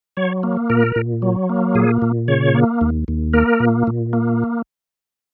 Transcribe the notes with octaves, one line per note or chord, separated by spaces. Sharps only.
F#3 C#5
A#3
A#2 A#4
A#2
F#3
A#3
A#2 G#4
A#2
C#3 C#5
A#3
D#2
D#2
A#3 A#4
A#2
A#2
A#3